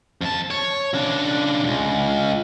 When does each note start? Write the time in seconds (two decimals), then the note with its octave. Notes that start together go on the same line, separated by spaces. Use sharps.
0.21 F2 A5
0.51 C#5
0.94 C#3 D4
1.64 C#2 G2